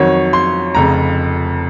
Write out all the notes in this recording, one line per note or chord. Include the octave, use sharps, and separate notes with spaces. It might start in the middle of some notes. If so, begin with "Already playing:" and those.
Already playing: F2 D#3 F#3 C#5
C6
F1 F2 C#3 A#5